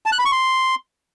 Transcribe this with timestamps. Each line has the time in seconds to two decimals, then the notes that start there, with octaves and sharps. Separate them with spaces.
0.06 A5
0.12 F#6
0.19 B5
0.25 C#6
0.32 C6